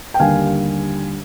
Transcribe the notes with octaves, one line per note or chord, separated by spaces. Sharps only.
G5
D#2 D3 G3 F5 G#5